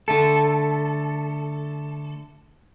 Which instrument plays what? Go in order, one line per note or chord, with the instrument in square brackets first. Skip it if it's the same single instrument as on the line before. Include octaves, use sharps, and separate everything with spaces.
[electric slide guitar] D3 A3 A4